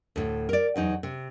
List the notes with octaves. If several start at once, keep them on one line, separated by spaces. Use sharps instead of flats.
D2 A2
A#4 D5
E2 F#3 D#4
C3